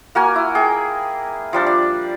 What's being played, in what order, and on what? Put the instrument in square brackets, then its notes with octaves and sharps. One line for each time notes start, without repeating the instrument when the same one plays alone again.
[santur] A#3 F#4 A#4 G#5
E4
G#4 G5
F3 G3 D4
D5